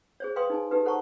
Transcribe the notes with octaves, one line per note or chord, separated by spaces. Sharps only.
G#4 C5 C#5
B4 F5 G5 C6 D#6
D#4 G#4 G#5
D#4 G4 A4 B4
A4 C5 F#5 A5 A#5 C#6